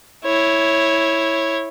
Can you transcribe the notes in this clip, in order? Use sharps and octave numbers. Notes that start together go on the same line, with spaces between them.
E4 C#5